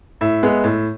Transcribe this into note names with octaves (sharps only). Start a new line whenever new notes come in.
A2 E5
G#3 B3
A2